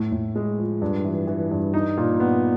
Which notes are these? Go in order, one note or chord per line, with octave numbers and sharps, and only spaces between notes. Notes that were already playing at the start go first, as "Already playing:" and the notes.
Already playing: A2
A2
G#3
F3
G2
E3
E3
G2
D#4
A#2
B3